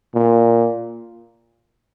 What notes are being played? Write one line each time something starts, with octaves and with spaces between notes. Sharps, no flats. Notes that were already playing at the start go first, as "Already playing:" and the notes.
A#2